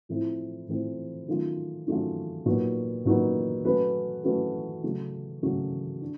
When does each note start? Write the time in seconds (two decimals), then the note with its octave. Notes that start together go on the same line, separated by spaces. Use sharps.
0.09 A2 F3 A3 C4 E4
0.68 A2 F3 A3 C4 E4
1.28 D#3 F#3 A3 C#4 F4
1.87 D#3 F#3 A3 C#4 F4
2.46 A#2 F#3 B3 D#4
3.05 A#2 F#3 B3 D#4
3.64 F#3 A3 C#4 F#4 B4
4.24 F#3 A3 C#4 F#4 B4
4.83 C#3 F#3 A3
5.42 C#3 F#3 A3
6.02 D4